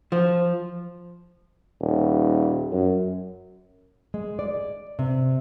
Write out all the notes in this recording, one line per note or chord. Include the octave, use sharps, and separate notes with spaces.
F3
D#1
F#2
G#3
D5
C3